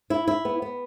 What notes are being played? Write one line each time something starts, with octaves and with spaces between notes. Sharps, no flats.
E4
E4
B3
B3